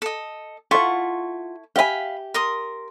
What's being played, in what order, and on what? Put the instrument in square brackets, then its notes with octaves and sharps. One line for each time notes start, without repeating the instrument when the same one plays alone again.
[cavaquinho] A4 D#5
[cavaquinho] E4 A4 C#6 [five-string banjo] F4 F#5
[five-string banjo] G4 E5 G#5 [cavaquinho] F5 B5
[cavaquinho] A#4 C6 D#6